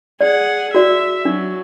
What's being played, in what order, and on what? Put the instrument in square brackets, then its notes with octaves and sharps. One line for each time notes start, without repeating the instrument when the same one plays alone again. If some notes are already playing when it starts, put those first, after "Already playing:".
[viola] G#4 F#5 [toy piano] D5
[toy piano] F#4 D5 [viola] E5
[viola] F#3 [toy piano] D4